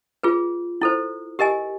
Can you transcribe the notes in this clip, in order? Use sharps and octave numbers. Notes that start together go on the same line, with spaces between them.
F4 G#4 B4
E4 A4 C5
G4 A#4 D#5 G#5